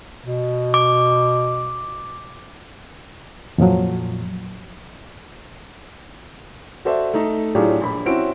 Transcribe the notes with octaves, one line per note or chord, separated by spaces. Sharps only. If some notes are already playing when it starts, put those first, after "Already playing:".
B2
D6
F2 A#2 F3 F#3
F#4 A4 C5 D5 E5
A3 D#4
A2 F#3 D4 F4 G4 G#4
A#1 B5
C4 C#4 E4 F#4 D7